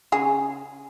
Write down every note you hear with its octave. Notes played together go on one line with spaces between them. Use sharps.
C#3 G#4